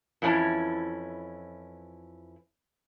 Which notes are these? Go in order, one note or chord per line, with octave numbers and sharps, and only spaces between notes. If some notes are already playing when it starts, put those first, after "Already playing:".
F2 E3 C#4 D4 E4 A5